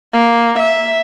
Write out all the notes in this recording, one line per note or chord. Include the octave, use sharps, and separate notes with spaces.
A#3
E5